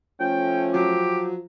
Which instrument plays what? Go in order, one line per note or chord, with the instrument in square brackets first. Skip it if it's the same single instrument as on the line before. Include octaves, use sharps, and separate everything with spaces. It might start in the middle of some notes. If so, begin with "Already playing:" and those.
[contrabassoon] F3 [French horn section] A3 C#4 [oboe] G5
[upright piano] F#3 [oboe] G4